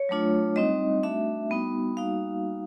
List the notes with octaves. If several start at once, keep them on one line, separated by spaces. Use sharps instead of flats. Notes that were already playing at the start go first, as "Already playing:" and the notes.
Already playing: C#5
F#3 A3 D4 F4
G3 C4 D#4 D#5
A3 D4 F#4 E5
G3 B3 D#4 F#4
G3 A#3 D#4 F#4 F5